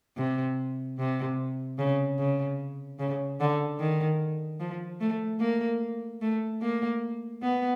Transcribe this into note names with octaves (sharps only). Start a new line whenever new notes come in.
C3
C3
C#3
C#3
C#3
D3
D#3
F3
A3
A#3
A3
A#3
B3